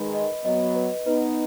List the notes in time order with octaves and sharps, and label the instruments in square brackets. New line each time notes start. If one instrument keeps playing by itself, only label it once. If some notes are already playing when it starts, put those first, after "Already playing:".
Already playing: [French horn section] D#3 G#3 [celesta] B4 B5
[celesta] D#5
[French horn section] F#3 B3 [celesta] D#5
[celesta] B4
[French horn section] B3 D#4 [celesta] B4